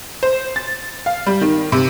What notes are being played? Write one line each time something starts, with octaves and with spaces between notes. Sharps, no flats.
C5
A6
F5
G3
D#3
C3